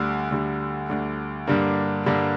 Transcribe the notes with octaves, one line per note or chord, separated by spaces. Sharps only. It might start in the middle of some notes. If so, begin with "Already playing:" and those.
Already playing: D2 D3 G3
D2 D3 G3
D2 D3 G3
G2 D3 G3 A#3 D4
G2 D3 G3 A#3 D4